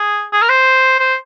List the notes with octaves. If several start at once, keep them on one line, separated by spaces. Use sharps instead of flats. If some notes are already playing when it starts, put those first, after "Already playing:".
Already playing: G#4
G#4
A#4
C5
C5